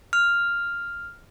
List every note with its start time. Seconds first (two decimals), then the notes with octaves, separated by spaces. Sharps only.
0.13 F6